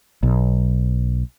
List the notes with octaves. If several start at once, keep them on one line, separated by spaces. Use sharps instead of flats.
B1